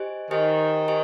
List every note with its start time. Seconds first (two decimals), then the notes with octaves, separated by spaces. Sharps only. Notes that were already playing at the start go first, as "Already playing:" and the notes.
Already playing: G4 C5 D#5 G#5
0.31 D#3 G4 C5 D#5 G#5
0.88 G4 C5 D#5 G#5